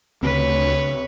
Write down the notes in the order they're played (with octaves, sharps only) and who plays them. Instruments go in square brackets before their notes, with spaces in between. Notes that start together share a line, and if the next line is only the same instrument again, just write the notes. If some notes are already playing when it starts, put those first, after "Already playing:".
[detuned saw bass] D2 [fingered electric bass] C#3 C4 [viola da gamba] B4 C#5